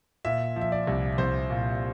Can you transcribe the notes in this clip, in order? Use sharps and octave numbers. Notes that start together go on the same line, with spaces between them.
A#2 E5
F3
E5
D5
C2
C2 C5
A#2